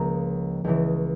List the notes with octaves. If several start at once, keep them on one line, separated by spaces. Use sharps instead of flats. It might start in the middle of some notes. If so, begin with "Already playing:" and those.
Already playing: C#2 C#3 F3 A#3 A#5
C#2 C#3 E3